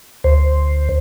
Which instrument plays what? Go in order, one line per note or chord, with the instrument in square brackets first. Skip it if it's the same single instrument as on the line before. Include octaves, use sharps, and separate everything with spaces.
[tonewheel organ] D2 C5